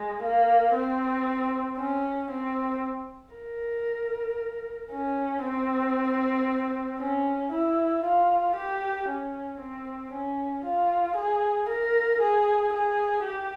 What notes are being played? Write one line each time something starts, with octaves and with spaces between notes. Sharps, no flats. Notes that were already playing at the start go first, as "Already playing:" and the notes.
Already playing: G#3
A#3
C4
C#4
C4
A#4
C#4
C4
C#4
E4
F4
G4
C#4
C4
C#4
F4
G#4
A#4
G#4
G#4
G4